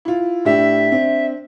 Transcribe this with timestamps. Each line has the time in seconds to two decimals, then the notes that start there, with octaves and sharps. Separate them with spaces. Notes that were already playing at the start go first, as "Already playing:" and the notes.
0.05 E4 F4
0.45 A2 D4 G4 E5
0.92 C4 D4